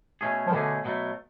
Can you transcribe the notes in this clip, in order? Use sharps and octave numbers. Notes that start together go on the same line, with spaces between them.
B2 A3 C#4 G#4
F3
B2 D3 A3 C#4 G#4
B2 F#3 A3